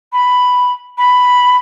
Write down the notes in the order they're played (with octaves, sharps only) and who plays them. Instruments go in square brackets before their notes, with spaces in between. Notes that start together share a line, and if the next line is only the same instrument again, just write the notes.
[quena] B5
B5